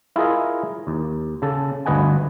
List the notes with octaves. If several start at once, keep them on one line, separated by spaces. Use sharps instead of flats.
E4 F4 G#4 A#4 D#5
D#2
C#3 A4
G1 D2 B4 D#5 F#5 G#5